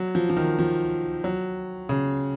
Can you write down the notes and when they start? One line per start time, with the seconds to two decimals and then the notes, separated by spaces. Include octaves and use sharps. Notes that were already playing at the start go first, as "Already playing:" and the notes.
Already playing: F#3
0.15 F3
0.30 F3
0.37 D#3
0.59 F3
1.24 F#3
1.89 C#3